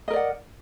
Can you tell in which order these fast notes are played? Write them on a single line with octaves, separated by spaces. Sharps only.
D#5 A#4 D5 F#5